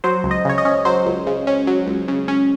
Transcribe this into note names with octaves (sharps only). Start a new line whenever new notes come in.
F#3 C5
C#2
D#5
C#3 C#5
D#5
C#4
F#3 C5
C#2
C#3
C#4
F#3
C#2
C#3
C#4